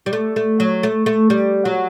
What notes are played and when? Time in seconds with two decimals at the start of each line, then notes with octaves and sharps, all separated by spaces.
0.06 G3
0.13 A3
0.36 A3
0.60 F#3
0.83 A3
1.06 A3
1.30 G3
1.65 F#3